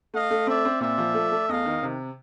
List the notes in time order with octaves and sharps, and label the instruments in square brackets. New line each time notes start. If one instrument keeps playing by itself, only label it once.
[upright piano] A3 [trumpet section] D#5 F5
[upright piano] A3
[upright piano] C4 [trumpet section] D5 E5
[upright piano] C4
[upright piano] A#2 [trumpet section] D5 E5
[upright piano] F3
A3
A3
[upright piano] E2 [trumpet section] D#5 F5
[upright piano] D#3
C3